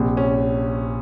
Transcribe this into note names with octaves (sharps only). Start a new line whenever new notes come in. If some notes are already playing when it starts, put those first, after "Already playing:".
Already playing: A#1 C3
C#4